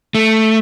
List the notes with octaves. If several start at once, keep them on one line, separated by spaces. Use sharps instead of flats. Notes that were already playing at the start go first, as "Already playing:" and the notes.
A3